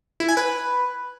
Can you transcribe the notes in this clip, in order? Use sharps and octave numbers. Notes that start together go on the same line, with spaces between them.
E4
G#5
B4